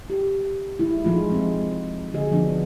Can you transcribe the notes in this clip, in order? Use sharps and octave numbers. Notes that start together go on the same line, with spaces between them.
G4
G#3 E4
F3 G#3 D#4 F4
G#3 C4
D3 F#4 G#4 D#5
F3 B3 D4